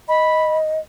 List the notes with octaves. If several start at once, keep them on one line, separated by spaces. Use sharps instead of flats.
D#5 B5